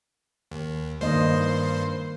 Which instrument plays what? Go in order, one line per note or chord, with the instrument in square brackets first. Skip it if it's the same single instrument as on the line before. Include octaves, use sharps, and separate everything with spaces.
[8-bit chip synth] D#2
[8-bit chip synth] G2 C5 C7 [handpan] D#3 A#3 D#5